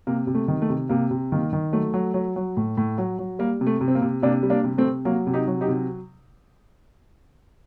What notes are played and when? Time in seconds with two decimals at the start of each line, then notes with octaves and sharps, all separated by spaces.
0.07 C3 A#3
0.27 C3
0.35 A3
0.48 D#3
0.62 A3
0.69 C3
0.89 C3 A#3
1.11 C3
1.32 D#3 A#3
1.53 D#3
1.73 F#3 A3
1.94 F#3
2.14 F#3
2.36 F#3
2.57 A2
2.77 A2
2.98 F#3
3.19 F#3
3.39 G3 A#3
3.61 C3
3.67 A3
3.81 C3
3.88 C4
3.95 A#3
4.02 C3
4.22 C3 A#3 D4
4.43 G3
4.50 A#3 D4
4.64 C3
4.78 A3 C4
4.84 C3
5.05 F#3 A#3
5.27 C3
5.33 D#4 G4
5.47 F#3
5.61 D#4 G4
5.68 C3